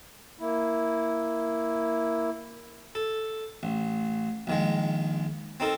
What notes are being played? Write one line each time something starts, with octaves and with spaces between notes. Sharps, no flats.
A#3 E4
A4
A1
A#1 D#3 G#3
C4 D#4 A4 A#4